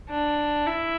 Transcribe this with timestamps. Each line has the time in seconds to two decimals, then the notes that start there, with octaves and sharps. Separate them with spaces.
0.10 D4
0.67 E4